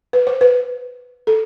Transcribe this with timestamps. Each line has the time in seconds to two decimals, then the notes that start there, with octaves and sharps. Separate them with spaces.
0.13 B4
0.27 C5
0.41 B4
1.27 A4